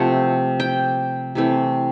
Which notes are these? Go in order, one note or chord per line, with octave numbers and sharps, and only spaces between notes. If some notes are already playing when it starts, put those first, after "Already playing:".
Already playing: C3 F3 A3 F#5
G5
C3 E3 A3 C4